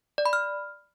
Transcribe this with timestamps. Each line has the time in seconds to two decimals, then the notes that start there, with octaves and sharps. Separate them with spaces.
0.18 D5
0.26 B5
0.33 F6